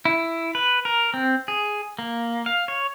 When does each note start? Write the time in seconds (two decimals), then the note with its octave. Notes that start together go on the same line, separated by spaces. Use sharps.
0.05 E4
0.55 B4
0.85 A#4
1.14 C4
1.48 G#4
1.99 A#3
2.46 F5
2.68 C#5